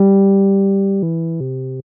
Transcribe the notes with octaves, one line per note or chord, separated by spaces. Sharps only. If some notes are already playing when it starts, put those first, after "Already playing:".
Already playing: G3
E3
C3